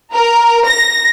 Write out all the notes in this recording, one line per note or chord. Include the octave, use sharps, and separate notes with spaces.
A#4
A#6